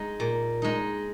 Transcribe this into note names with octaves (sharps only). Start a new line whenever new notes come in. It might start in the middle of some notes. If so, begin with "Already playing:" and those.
Already playing: G#3 D#4
A#2
G#3 D#4